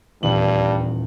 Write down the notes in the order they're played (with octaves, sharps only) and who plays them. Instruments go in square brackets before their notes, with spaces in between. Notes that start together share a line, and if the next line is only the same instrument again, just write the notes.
[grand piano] D#1 E2 F#7 [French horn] G2